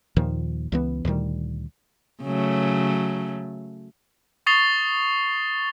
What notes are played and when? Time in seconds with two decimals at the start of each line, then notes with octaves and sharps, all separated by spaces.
0.16 D#2 A#2 D#3 F3
0.72 C#2 E3 B3
1.05 D2 A#2 D#3 G3
2.23 C#3 F#3 A3
4.46 C#6 D#6 A6 C7 F7 G7